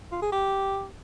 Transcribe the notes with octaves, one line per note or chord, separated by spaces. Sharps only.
F4
G#4
G4